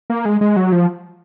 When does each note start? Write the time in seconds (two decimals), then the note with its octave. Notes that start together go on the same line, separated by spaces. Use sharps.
0.10 A#3
0.25 G#3
0.41 G#3
0.56 F#3
0.72 F3